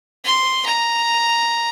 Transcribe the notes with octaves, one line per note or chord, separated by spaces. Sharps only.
C6
A#5